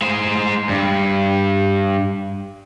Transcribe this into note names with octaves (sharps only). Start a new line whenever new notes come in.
G#3 C5
G2